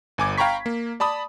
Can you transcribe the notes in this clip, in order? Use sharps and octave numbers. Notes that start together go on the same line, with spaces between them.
G1 G#5 D6 G#6
F5 G5 A#5 B5 C#6 B6
A#3
D5 A5 B5 D#6